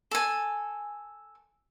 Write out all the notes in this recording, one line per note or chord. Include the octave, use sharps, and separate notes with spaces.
A4 G#5